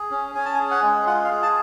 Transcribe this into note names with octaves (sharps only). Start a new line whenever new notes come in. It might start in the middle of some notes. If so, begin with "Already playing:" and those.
Already playing: G#4
C#4
C#4 G#5
A5
G#5
G#4
F#5
G#3
F4 F#5
F5
G#4
A5